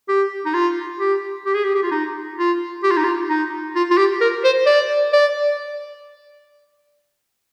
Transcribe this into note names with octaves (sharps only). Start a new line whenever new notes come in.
G4
D#4
F4
G4
G4
G#4
G4
G4
F4
D#4
F4
G4
F4
D#4
F4
D#4
F4
F4
G4
A#4
C5
D5
D5